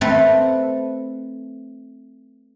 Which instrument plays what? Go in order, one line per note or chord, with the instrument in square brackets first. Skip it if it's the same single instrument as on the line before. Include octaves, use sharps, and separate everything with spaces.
[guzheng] A3 C4 A4 B4